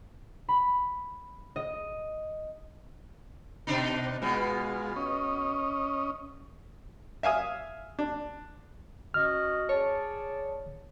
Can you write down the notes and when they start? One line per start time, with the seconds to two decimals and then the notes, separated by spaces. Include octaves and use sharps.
0.48 B5
1.56 D#5
3.67 B2 D4 D#4
4.22 B2 G#3 B3 F4
4.96 C#4 D#5
7.23 E5 F5 G#5 D#6
7.99 D4
9.14 C#4 F#4 D#5 F6
9.69 G#4 C#5 D5 A5